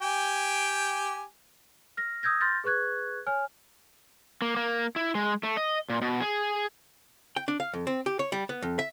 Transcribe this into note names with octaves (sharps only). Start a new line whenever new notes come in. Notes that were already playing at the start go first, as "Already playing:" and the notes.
G4 G5 G#5
F6 A#6
D#6 E6 G6 G#6 A#6
C6 F6 G6 A6 A#6
G#4 B4 C#6 F#6 G#6
C#5 G#5 F6
A#3
A#3
E4
G#3
A3
D#5
A#2
B2
G#4
G5
D4
F5
F2
C4
G4
C#5
G3
B3
F2
E5